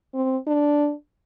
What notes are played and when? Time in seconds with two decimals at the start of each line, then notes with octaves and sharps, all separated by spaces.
0.14 C4
0.47 D4